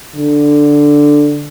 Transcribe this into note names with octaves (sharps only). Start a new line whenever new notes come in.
D3